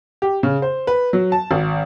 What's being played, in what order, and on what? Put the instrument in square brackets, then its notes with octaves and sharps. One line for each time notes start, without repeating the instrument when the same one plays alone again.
[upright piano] G4
C#3
C5
B4
F#3
A5
G#1